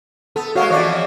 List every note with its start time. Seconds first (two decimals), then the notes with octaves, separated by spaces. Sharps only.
0.36 B3 A4
0.56 G#3 A#3 B3 F#4 C#5 F5
0.70 F2 E3 F3 C#5 D5